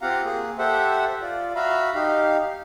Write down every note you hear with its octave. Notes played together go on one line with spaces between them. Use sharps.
C4 F4 G4 F5 F#5 A#5
A#3 G#4
G4 A4 C5 E5 F#5
F4 D5
F#4 E5 F5 A#5 B5
D#4 G4 F5